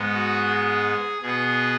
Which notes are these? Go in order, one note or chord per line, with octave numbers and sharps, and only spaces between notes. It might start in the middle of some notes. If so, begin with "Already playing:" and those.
Already playing: G#2 G#3 B3
F#4
G#4
B2 B3 G#4